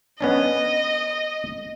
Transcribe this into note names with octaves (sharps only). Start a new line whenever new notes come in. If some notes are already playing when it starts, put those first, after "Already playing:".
B3 C#4 D4 D#5